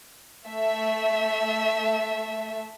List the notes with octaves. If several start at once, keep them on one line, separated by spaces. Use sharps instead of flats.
A3 E5